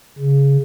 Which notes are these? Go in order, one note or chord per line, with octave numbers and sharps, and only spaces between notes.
C#3